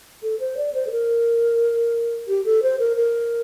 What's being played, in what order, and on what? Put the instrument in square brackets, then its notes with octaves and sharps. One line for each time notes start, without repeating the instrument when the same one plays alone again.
[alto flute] A4
C5
D5
C5
A4
A#4
G4
A4
C5
A#4
A#4